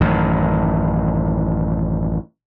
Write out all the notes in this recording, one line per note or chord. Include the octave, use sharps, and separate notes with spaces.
A1 F#2 D#3